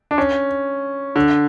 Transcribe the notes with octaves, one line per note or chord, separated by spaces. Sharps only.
D4
C#4
D3